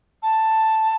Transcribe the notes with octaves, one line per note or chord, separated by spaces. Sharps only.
A5